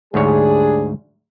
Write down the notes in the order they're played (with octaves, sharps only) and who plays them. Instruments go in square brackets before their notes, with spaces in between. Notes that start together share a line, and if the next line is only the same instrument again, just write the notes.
[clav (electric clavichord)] D2 G#2 C#5 [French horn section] G3 D4 G#4